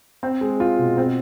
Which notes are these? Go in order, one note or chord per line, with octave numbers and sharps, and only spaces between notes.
C4
G#3
F4
B2
C4